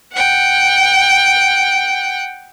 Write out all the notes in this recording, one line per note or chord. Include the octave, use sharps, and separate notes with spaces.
F#5 G5